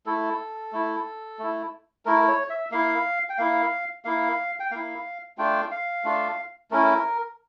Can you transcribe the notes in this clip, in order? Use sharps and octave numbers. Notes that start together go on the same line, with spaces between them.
A3 E4 A4
A3 E4
A3 E4
A3 E4 A#4
C#5
E5
A#3 E4 F5
G5
A#3 E4 F5
A#3 E4 F5
G5
A#3 E4 F5
A3 D4 F4 G5
F5
A3 D4 F4
A3 C#4 E4 A#4